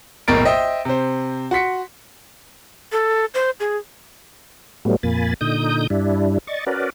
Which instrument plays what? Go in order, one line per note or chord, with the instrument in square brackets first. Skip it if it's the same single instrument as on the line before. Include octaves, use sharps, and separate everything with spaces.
[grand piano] F#1 B1 A2 A#4 A6 D7
C5 D#5 E5 G5
C3 C5
F#4 C6 B6 C#7
[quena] A4
C5
G#4
[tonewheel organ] A2 F#3 G3 A3 B3
F2 A#2 A#3 G#5 B5 A6
A#2 D3 D#4 D#6 G6
G2 G3 D4 E4
D5 D#5 C#6 A6
C#4 F#4 A#4 B4 D5